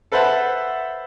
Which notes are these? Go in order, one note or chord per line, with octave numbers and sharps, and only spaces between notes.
A4 B4 C5 E5 F#5 A5